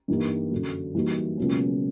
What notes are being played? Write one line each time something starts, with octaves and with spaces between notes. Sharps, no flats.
G2 E3 G3 A#3 D#4
F#2 D3 F#3
E3 G3 A#3 D#4 F#4
C#2 B2 F#3 A#3 C#4